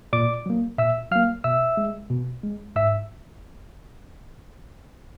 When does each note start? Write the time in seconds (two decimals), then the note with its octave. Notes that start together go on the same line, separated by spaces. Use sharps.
0.13 A#2 D5 D6
0.46 F#3 A#3
0.78 A#2 E5 E6
1.12 F#3 A#3 F5 F6
1.44 B2 E5 E6
1.77 G#3
2.10 B2
2.43 G#3
2.76 G#2 E5 E6